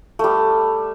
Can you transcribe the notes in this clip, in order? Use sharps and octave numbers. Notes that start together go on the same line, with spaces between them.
G3 A3